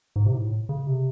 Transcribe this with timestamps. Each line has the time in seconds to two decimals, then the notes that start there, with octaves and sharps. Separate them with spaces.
0.16 G#2
0.26 C3
0.33 A2
0.69 C#3
0.87 C3